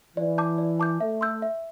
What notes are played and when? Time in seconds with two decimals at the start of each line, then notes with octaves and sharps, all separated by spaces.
0.17 E3 D5
0.38 A5 D6 G6
0.58 D5
0.79 A5 D6 G6
1.00 A3 E5
1.21 C6 E6 G6
1.42 E5